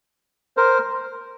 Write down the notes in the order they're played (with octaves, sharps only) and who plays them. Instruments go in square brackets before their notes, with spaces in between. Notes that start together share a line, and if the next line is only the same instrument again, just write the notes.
[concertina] A#4 C5